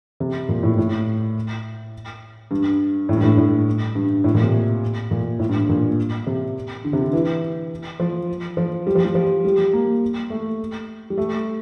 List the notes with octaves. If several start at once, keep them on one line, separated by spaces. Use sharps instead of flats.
C3
A#2
A2
A2
G2
A2
G2
A2
A2
G2
A2
A#2
C3
A#2
A2
G2
A#2
C3
D3
C3
D3
E3
F3
F3
G3
F3
G3
F3
G3
A#3
A3
G3
A3